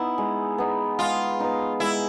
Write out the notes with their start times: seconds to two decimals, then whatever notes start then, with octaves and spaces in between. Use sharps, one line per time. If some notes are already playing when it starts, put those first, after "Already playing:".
Already playing: B3 D#4 E4
0.18 G#3
0.58 B3 D#4
0.99 G#3 F4
1.40 B3 D#4
1.80 G#3 E4